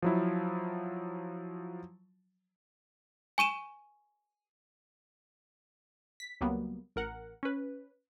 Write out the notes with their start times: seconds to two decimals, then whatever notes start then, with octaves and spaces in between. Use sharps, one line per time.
0.02 F3 F#3 E4
3.38 G#5 C#6 D#7 E7
6.20 B6
6.41 C#2 F#3 G3 A#3 B3
6.96 A1 A#4 F#5
7.43 C#4 B4